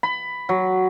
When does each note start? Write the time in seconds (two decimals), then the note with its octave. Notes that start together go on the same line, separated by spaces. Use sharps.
0.03 B5
0.49 F#3